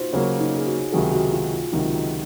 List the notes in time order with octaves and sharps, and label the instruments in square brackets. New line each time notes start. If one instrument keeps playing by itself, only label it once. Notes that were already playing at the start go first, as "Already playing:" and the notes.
Already playing: [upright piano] D#4 F4 F#4 C5
[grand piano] C#3 F#3 A#3 [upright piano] C#5
[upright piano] D#4
G#4
F#4
[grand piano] C#2 C3 D#3 F#3 [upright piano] G#4
[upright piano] F#4
F4
F4
[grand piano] C#2 C3 D#3 F#3 [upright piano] D#4